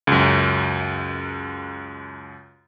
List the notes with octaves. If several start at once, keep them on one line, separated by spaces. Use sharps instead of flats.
C#2 F#2